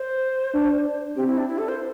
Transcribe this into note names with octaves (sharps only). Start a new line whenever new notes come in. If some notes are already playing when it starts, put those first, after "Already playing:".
Already playing: C5
D4
C4 G4
E4
D4
E4
A4
C5